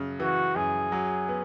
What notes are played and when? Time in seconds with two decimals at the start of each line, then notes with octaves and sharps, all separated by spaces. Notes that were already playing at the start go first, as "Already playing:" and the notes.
Already playing: F#2 C#3
0.20 E3 F#4
0.56 F#2 G#4
0.92 F#3
1.29 B3